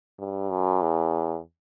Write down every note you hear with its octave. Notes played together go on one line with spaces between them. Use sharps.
G2
F#2
E2